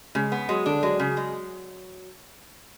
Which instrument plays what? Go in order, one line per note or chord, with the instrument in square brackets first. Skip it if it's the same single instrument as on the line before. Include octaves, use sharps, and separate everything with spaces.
[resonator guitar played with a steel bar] C#3 [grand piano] G#3
[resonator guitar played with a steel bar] B3
[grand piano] F#3 [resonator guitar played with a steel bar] G#3
[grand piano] D3 [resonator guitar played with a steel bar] D4
[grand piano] F#3 [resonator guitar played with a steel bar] G#3
[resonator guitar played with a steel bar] C#3
G#3